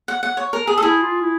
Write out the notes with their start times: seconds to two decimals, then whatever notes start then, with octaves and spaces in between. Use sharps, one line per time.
0.08 F#5
0.23 F#5
0.37 C#5
0.53 A#4
0.67 G#4
0.77 A4
0.82 E4 G#4
1.02 F4
1.22 E4